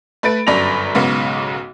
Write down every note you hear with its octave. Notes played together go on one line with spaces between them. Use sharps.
A3 B4 B5 A6 D7
G1 F#2 D5 B5 A#6 F7
B1 G#2 C#3 B3